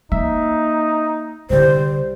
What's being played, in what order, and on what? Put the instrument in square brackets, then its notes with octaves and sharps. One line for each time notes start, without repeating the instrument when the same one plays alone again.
[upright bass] A#3 [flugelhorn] D#4 [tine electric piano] E5
[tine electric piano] C2 G3 [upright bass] D3 E4 [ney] C5